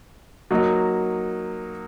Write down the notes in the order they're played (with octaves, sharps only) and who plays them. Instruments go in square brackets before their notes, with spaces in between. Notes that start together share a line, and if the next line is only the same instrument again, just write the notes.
[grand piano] F#3 A#3 D#4